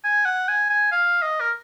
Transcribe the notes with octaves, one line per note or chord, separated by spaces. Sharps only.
G#5
F#5
G#5
G#5
F5
D#5
A#4